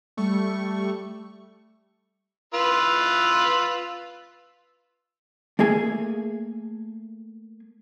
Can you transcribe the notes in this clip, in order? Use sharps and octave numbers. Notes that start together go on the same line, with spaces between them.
G3 A3 C#6
F4 B4 E6
A3 A#3 G#4 G#5